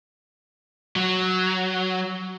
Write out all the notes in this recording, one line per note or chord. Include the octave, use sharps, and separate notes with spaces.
F#3